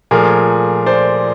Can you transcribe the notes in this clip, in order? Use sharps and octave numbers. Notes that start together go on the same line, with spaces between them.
A#2 F3 A3 G#4 A#4
C5 D5